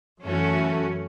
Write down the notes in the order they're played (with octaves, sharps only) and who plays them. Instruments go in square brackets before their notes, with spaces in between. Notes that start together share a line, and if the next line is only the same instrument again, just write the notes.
[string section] F#2 E3 A3 C#4 F#4